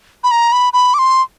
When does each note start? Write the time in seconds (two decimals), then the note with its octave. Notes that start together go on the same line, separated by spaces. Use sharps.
0.24 B5
0.31 A#5
0.52 B5
0.73 B5
0.94 D6
0.99 C6